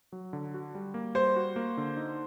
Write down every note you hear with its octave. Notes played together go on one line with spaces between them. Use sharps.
F#3
D3
F#4
G3
A#3
G3 C5
F#4
A#3
D3
D#4